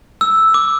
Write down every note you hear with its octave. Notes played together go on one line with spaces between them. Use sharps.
E6
D6